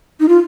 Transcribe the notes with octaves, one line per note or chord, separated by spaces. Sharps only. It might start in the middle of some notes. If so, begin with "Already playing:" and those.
D#4
F4